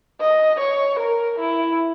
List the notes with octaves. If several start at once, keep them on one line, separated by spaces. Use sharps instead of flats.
D#5
C#5
A#4
E4